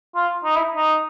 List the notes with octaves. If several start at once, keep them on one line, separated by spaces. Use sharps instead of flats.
F4
D#4
E4
D#4